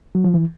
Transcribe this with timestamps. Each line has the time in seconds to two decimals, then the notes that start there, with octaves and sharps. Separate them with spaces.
0.15 F#3
0.24 F3
0.34 E3